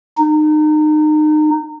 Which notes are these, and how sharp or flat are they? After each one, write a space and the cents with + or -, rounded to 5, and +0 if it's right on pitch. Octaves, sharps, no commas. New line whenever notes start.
D#4 -30